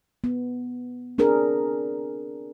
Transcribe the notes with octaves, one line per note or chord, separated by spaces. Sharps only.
B3
C4 D4 G#4 A#4